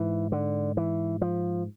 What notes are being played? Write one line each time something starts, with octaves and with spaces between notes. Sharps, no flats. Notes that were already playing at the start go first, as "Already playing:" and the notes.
Already playing: G#2 E3
D3
E3
F3